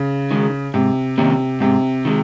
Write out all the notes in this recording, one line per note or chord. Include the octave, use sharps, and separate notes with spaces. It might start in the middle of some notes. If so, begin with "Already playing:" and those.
Already playing: C#3
D#3 G#3
G#2 C3
C3 D#3 A#3 C#4
G#2 C3
D#3 G#3